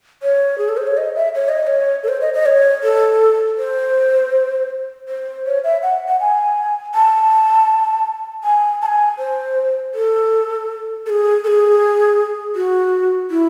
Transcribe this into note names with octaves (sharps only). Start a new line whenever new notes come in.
C#5
G#4
A4
C5
C#5
D#5
E5
C#5
D#5
D#5
C#5
A4
C5
D#5
D#5
C#5
A4
C5
C5
C#5
E5
F#5
F#5
G#5
A5
G#5
A5
G#5
C5
A4
A4
G#4
A4
G#4
F#4
E4